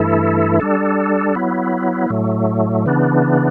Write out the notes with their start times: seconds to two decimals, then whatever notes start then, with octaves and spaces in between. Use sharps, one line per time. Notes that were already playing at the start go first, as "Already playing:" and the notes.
Already playing: G2 E3 A3 E4 A4
0.60 G3 D4 A4
1.35 F#3 B3 E4
2.10 A2 F#3 A3
2.86 C#3 E3 B3 D4